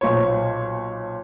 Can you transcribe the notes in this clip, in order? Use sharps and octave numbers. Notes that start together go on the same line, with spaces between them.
B1 A#2 C5 C#5